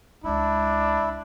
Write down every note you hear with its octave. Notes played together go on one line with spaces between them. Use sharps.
C#2 G#3 D4 E4